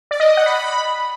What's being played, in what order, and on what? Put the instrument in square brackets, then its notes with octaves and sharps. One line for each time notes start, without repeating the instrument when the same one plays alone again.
[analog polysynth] D5
D#5
D#6
F#5
B5